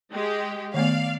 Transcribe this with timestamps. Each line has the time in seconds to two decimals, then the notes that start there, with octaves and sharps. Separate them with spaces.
0.11 G#3 G4
0.74 D#3 A3 B3 D5 F5